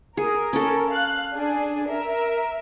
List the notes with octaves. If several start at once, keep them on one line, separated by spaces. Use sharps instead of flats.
G#4 A#4
C#4 A4
F5 F#6
D4 G#4
A#4 E5